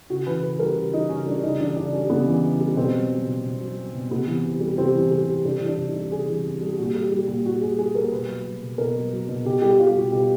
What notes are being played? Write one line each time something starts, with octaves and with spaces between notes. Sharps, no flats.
C#3 F#4
E3 B4
C#3 B4
G3 A#4
C#3
E3 D#4
C#3 C#4
G3 D4
C#3 D#4
E3 D4
C#3 D4
G3 C#4
C#3 B3
E3
C#3
G3
B2 C4
F#3
F#3
B2
B2
F#3
F#3
B2
C3 B3
E3
C3
G3
C3 C4
E3
C3
G3
C3 D4
E3
D4
C3
D#4
G3
C3 G#4
E3
C3
G3
A#2 F#4
G3
G3
A#2
A#2 F#4
G3 G#4
G3 G#4
A#2 A#4
B2 B4
F#3
F#3
B2
B2 A#4
F#3
F#3
B2
B2 G4
G3 G4
G3 F4
B2 F#4
B2 G4